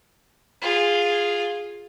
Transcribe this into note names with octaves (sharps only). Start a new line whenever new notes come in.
F4 G#4